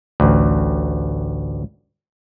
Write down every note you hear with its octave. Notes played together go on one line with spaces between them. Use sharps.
A1 D2